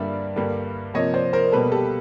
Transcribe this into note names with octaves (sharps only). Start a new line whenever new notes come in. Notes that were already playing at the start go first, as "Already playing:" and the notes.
Already playing: G2 D3 G3 A#3 D5 E5
G2 D3 G3 A#3
C3 F3 A#3 C#5 D#5
C5 D5
A#4 C5
B2 G3 A#3 A4 B4
G4 A4